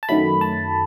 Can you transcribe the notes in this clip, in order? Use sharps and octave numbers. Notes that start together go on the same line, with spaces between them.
A5
F#2 D#3 F#3 A3 B5
A5